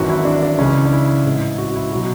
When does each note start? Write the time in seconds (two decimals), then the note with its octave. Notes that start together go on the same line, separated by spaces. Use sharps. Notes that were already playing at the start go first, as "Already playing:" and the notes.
Already playing: G#1 F#2 E3 F#4
0.09 E4
0.25 D4
0.43 D4
0.59 C#2 C#3 E3 C#4
0.85 D4
0.93 E4
1.25 A1 G#2 E3
1.58 F#4
1.75 E4
1.92 B2 F#3 F#4